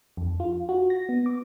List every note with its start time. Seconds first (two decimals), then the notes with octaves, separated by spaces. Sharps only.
0.17 F2
0.40 F4
0.69 F#4
0.90 A#6
1.09 B3
1.26 D6